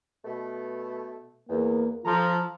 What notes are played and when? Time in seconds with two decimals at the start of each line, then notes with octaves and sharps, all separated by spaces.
0.25 B2 A3
1.49 E2 A#3
2.05 F3 F4 A4 A#5